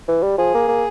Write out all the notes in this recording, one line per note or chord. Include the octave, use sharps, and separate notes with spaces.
E3
G3
F3 G#4
A#3
A#3